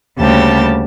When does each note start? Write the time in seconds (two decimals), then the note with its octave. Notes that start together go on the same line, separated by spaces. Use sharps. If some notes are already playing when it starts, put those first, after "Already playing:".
0.19 D2 C#3 G3 A#3 G4 A5